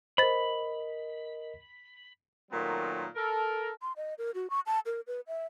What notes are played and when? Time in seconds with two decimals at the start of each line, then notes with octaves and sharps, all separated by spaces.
0.18 A#4 C5 D#5 B5 A6
2.51 A#2 D#3 F#3 A3 B3 C4
3.15 A4 A#4
3.81 C6
3.96 D#5
4.18 A#4
4.35 F#4
4.50 C#6
4.66 A5
4.86 A#4
5.07 B4
5.27 E5